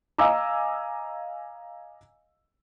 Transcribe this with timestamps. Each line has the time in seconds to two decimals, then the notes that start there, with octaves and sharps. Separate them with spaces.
0.19 D#5 F5 G#5 A#5 D6 E6